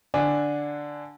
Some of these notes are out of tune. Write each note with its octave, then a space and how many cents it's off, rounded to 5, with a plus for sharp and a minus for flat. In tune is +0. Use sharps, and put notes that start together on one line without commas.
D3 +0 D4 +0 G#5 -10